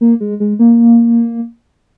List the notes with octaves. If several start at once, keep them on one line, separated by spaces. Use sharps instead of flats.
A#3
G#3
G#3
A#3